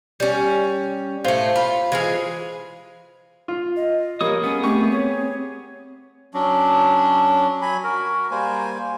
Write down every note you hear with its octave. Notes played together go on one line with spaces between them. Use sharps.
G3 C#4
A2 A3 C5 F5
F4 B5
E3 G#3 F4 G#4 F6
F4
D#5
G3 A#3 A#4 C#5 D#6
B3 C#4 G#4
A3 C4 G4 C#6
C#5
F#3 C#4 D4
F#3 G#5 B5
F#4 A#4
G3 A#3 C5 G#5